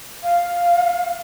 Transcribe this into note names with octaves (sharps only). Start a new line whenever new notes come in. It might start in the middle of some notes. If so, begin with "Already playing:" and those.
F5